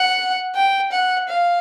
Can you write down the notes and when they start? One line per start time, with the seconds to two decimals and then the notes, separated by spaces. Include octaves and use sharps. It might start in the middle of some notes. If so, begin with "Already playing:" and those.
Already playing: F#5
0.55 G5
0.92 F#5
1.28 F5